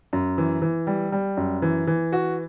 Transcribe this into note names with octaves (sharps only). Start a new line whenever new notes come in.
F#2
E3
E3
G3
G3
F#2
E3
E3
F#4